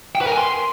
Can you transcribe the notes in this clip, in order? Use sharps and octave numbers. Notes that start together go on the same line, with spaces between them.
G5
B4
A#4
G#5
C6